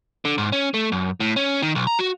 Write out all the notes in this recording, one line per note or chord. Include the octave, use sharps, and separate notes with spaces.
D3
G#2
C#4
A3
F#2
A2
C#4
D#3
B1
A#5
F#4